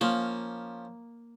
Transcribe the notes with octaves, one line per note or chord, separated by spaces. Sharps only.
F3 A#3 C#4